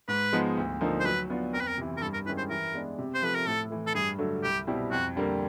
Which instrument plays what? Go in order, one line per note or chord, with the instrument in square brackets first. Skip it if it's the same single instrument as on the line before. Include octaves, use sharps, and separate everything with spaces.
[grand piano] G#2 [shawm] B4
[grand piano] F3 G#3 B3 D#4
D2
D3 F3 A#3 D#4
[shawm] C5
[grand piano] F#3 [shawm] B4
[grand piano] B3 D4 F4
[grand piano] F2 [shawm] A#4
[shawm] B4
A#4
[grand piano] C3 E3
[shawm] A#4
[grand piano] G2 [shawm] A4
[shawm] A#4
[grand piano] D#3 G#3 C#4 E4 [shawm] B4
[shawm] C5
[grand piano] E3 [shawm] A#4
[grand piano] G#3 B3 D4
C3
[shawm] C5
[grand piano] F3 A3 [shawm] B4
[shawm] A#4
[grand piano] A2 [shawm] A4
[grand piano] E3 A3
[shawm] A4
[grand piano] G2 [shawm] G#4
[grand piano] D3 F#3 A3
[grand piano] C2 [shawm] G4
[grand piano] B2 G3 C4 E4
[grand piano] F2 [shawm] F#4
[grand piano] D3 G3 A#3